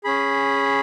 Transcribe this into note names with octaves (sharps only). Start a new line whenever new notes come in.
C#4 G#4 B5